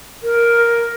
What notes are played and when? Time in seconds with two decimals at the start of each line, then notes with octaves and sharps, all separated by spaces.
0.23 A#4